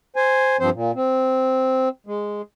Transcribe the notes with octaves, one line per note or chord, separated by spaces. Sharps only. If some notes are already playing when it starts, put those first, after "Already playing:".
C5 G#5
G2 F3 C4 C5
A#2
C4
G#3